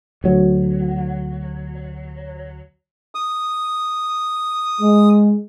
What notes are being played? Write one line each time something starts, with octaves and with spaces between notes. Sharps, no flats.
D2 F#3
D#6
G#3